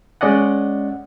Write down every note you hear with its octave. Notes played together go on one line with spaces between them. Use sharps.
G#3 C#4 D5 D#5 F#5